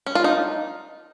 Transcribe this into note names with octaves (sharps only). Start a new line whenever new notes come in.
C#4
F4
D#4